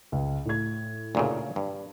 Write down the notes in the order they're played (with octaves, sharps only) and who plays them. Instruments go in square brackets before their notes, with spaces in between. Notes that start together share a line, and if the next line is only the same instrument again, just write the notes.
[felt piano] C#2
A2 G#6
[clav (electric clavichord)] D2 A#2 C#3
G2